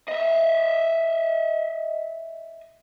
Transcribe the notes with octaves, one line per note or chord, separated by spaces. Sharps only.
D#5 E5